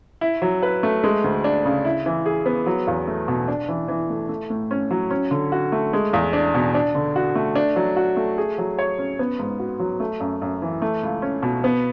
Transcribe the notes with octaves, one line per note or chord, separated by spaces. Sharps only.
E4
F#3
B4
A3
G#3
D2
D4
C#3
E4
E3
G#4
B3
F#3
E2
A3
B2
D4
E3
E3
A3
A3
A2
C#4
F#3
C#4
D3
F#4
A3
G#3
E2
D4
B2
D4
D3
F#4
A3
D4
F#3
F#4
A3
G#4
F#3
C#5
C#4
B3
G#2
F#4
F#3
A3
F#2
F#2
E3
A3
C#2
C#4
B2
B3